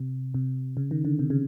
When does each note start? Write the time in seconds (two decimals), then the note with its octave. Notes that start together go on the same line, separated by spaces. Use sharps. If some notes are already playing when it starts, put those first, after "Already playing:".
Already playing: C3
0.34 C3
0.77 C#3
0.91 D#3
1.05 D3
1.19 C3
1.30 C#3